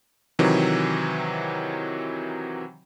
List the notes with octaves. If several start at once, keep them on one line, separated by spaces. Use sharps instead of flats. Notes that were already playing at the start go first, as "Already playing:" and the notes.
C3 D#3 E3 F#3